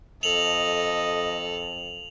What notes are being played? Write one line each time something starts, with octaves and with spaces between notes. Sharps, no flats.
F2 A4 D#5 F7 F#7